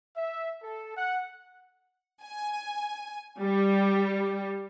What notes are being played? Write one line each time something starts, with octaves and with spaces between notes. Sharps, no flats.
E5
A4
F#5
G#5
G3